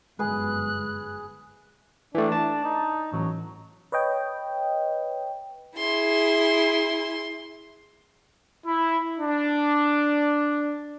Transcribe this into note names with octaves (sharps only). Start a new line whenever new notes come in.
G1 F#2 G#3 G#4 B4 F#6
E3 A3 D4
A5
D#4
A1 F#3
B4 C#5 D#5 G5
E4 G#4 C6
E4
D4